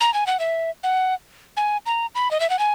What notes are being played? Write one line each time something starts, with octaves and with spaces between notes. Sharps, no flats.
A#5
G#5
F#5
E5
F#5
G#5
A#5
B5
D#5
E5
F#5
G#5